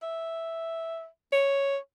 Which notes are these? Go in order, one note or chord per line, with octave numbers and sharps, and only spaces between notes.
E5
C#5